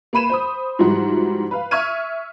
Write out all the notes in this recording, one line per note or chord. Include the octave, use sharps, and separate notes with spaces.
A#3 B4 B5 D#7 E7
C5 B5 D#6
G#2 E3 F3 G3 F#4
B4 F5
E5 C#6 F6 G#6 D#7